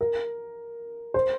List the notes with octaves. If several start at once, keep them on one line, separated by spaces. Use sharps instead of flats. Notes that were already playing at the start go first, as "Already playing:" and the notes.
A#4
C5